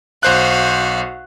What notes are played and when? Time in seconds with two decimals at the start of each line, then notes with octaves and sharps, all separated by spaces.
0.23 B1 F#4 C5 F5 F#6